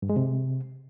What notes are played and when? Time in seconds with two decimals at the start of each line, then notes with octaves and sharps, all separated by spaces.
0.02 G2
0.09 G#3
0.16 C3